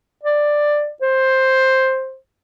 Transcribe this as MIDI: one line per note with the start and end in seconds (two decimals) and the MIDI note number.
0.23 0.89 74
1.02 2.16 72